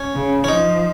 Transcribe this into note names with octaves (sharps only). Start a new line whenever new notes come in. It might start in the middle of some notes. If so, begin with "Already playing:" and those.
Already playing: C#4
C#3
C#4
F3 D#4